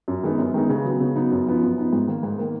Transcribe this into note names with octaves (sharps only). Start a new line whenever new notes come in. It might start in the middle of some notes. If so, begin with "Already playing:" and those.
F#2
D#3 G#3 B3 D#4
F#2
D#3 G#3 B3 D#4
C#3
F#3 B3 D#4
C#3
F#3 B3 D#4
F#2
F3 B3 D#4
F#2
F3 B3 D#4
G#2
D#3 A#3
G#2
D#3 A#3